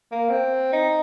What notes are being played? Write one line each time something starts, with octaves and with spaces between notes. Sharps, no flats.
A#3
C4
D#4